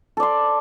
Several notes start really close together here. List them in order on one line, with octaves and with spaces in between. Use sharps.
A4 D5 C6